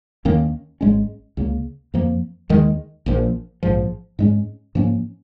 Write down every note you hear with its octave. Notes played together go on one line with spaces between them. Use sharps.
D#2 D#3 A#3 C#4
G#1 G#2 G#3 C#4
C#2 C#3 A#3
F2 F3 A#3
D#2 D#3 G#3
A#1 A#2 F3
A#1 G#2 F3
G#2 G#3 C#4
G#2 F3 A#3 C#4